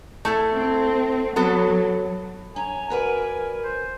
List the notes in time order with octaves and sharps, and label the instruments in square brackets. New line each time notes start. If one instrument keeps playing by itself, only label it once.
[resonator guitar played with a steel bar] A3 E4 A4
[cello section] C4
[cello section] F#3 [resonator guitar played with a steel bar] B3 F#4 A4
[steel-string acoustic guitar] C#4 [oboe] G#5 [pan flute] A#5
[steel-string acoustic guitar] F#4 B4 D5 [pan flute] A#4
[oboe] C5